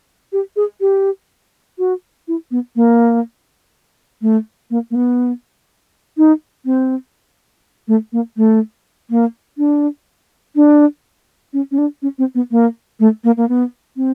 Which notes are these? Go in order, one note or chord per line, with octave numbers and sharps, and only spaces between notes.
G4
G#4
G4
F#4
E4
B3
A#3
A3
A#3
A#3
B3
D#4
C4
A3
A#3
A3
A#3
D4
D4
C#4
C#4
D4
C#4
C4
B3
A#3
A3
A#3
A#3
B3
C4